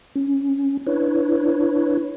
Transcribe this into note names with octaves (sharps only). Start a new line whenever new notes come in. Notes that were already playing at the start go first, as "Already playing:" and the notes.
C#4
D4 E4 B4 C#5